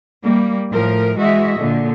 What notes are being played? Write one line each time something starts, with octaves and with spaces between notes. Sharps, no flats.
G3 A#3
A2 F3 A#4
E3 G#3 F#4 D#5 E5
A#2 D3